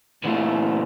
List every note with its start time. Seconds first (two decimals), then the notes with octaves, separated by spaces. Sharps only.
0.24 A#2 E3 A3